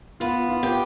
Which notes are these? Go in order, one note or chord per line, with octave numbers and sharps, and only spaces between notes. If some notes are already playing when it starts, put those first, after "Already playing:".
B3 F4
F4
G4